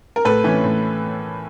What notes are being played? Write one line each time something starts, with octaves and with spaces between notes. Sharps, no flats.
A#4
A2 A4 B4
E3 A3 C#4
A2